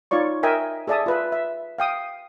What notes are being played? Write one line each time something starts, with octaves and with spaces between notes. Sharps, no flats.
D#4 F4 C#5 D5 C#6
A#4 D#5 E5 G5 G#5
G#4 A4 D5 E5 A5 D#6
F4 B4 E5
E5
F5 G5 D#6